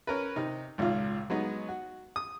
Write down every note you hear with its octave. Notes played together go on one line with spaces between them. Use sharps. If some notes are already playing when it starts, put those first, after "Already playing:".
C#4 A#4 B4
C3 D#4
G#1 C#2 A#2 F4
F#3 G#3 B3 D#4
F#4
D#6